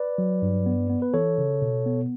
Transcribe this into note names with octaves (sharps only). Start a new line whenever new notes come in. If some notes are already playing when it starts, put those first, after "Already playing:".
Already playing: B4 D5
F#3
G2
B3
B3
B4
E3 A4 C#5
C#3
B2
B3